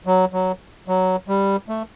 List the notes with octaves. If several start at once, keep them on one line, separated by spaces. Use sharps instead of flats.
F#3
F#3
F#3
G3
A3